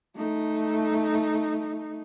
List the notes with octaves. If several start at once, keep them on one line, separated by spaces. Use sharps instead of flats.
A3 D#4